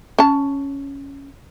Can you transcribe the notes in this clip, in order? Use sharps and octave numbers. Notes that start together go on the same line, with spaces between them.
C#4 A5